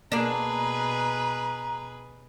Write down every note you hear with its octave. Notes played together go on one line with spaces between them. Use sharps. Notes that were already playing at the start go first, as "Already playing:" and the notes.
B2 A#3 D4 G#4 B4 A#5